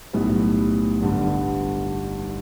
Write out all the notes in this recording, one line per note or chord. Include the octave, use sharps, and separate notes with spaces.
B1 A2 G3 B3
G1 G2 D3 G3